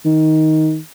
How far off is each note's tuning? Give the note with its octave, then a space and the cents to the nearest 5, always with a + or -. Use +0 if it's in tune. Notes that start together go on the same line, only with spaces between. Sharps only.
D#3 +10